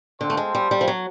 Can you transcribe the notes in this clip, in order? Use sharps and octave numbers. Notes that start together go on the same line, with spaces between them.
D3 C4 F4 A4 C5
A3
G#3
G3
G3
F3
F#3